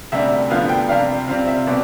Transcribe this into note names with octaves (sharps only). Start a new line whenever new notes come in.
D2 C3 G3 D4 E5
D2 D3 F3 B3 F5
G5
C3 G3 D4 F5
C3 G3 C4 F4 F5
E5
B2 G3 C4 D5